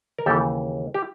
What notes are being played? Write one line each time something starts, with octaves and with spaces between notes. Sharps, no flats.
A#4
D#2 C#3 E3 G4 A4
G4